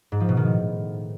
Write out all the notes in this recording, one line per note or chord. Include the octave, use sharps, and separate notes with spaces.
G#2
F3
B2
D#3
A2